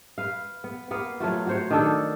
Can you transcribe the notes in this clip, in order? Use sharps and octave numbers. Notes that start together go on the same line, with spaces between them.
B4 F5
B3
A#3 B3 F5
F#3 A3 F4 F#4
F#4 C5 C#5
D#3 D4 A4